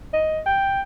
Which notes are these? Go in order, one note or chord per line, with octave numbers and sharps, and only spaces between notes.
D#5
G5